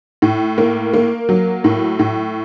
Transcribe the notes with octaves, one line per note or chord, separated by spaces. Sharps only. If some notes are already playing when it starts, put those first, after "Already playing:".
A2
A#3
A#3
F#3
A2
A2